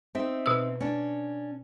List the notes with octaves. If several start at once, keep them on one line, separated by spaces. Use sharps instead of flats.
C4 D#4 E5
B2 E6
C#4 D4